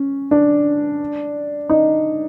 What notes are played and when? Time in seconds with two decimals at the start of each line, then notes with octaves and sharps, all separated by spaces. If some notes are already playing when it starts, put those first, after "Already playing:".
Already playing: C#4
0.31 D4
1.69 D#4